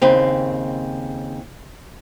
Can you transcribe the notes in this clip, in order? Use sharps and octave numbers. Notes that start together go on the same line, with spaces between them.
D#2 C#3 C4